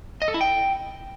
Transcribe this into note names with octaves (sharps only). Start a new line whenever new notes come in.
D#5
A4
E4
G5